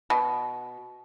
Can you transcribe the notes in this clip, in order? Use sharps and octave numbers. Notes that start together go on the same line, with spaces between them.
B2